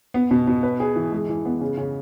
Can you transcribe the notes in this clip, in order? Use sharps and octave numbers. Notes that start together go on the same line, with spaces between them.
B3
B2
B2
B4
G#4
E3
G#3
E3
B3
C#3
C#3